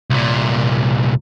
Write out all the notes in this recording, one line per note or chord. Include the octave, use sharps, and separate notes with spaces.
C2 A#2